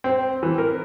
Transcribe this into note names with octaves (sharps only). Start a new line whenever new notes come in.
C4
E3
A#4